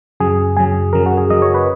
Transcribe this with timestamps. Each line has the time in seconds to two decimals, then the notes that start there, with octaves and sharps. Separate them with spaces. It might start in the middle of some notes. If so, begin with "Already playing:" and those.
0.20 F#2 C#3 F#3 G#4
0.57 F#2 C#3 F#3 G#4
0.93 F#2 C#3 F#3 A#4
1.06 F#4
1.17 G#4
1.30 F#2 C#3 F#3 D#5
1.42 C#5
1.54 B4